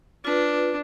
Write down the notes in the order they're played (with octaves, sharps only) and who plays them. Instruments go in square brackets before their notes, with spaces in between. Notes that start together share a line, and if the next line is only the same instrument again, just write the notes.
[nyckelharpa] D4 [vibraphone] F4 B4